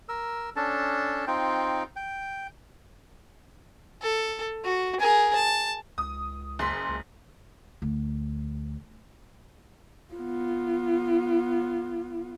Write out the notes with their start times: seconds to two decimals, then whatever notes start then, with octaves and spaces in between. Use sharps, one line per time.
0.09 A#4 E6
0.56 C#4 D4 A4 A5
1.27 C4 D#4 F4 G5
1.96 G5
4.02 A4
4.65 F#4
5.00 G#4 A#4
5.36 A5
5.98 C#2 D#6
6.59 F#1 C6 B6
6.89 C#2
7.82 D2
10.14 B3 F4